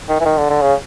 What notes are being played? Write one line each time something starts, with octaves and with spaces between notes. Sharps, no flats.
D#3
E3
D#3
D3
D3
C#3